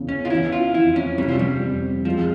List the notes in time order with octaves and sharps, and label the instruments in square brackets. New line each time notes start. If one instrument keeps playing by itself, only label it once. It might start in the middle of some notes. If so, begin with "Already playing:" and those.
Already playing: [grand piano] E2 C#3
[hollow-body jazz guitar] C#4
F4
[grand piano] E3 [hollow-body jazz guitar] E4
[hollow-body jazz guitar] F4
[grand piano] F2 [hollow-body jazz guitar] E4
[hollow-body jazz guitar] C#4
[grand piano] C3 [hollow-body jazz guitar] G3
[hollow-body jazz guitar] F3
G3
[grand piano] F2
[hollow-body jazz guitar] F3 [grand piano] G#3